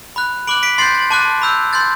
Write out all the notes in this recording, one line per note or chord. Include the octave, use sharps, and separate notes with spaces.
B5 F#6
B5 D6 F#6 D7 F#7
B6 D7
C6 G6 A6 C7
A6
A5 D6 F#6
B5 E6 G6
C6 G6 A6